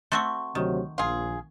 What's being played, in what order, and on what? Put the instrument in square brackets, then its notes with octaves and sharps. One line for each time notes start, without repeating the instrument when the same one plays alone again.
[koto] A3 C4 F#4 [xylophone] C6 C#6
[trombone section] D2 C3 F#3 [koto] D#3
[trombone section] A#1 [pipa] F4 G#4